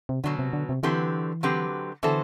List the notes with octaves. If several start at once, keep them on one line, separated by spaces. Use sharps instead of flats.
C3
B2 D3 F#3 B3
C3
D3
C3
D3 E3 F#3 C4 G4 B4
D3 F#3 C4 G4 B4
D3 E3 B3 F#4 A4 C5